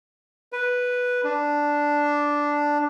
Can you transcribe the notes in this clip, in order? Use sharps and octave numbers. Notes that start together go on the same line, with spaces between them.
B4
D4